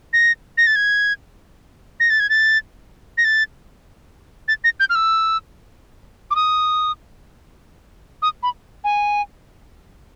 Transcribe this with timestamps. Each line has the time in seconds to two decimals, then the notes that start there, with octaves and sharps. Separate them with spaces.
0.13 A#6
0.58 A#6
0.67 A6
0.76 G#6
2.00 A#6
2.10 A6
2.20 G#6
2.30 A6
3.18 A#6
3.25 A6
4.48 A6
4.64 A#6
4.80 G6
4.90 F6
4.95 E6
6.31 D6
6.36 D#6
8.22 D#6
8.43 B5
8.84 G#5